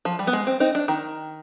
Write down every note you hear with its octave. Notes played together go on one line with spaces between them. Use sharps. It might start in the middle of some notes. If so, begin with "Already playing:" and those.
F3
G3
B3
G#3
C4
C4 D#4
D4
D#3